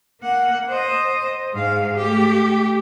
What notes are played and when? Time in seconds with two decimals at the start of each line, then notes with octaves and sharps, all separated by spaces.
0.21 A#3 F#5
0.68 C5 D#5
1.53 G#2 F5
1.95 A3 G4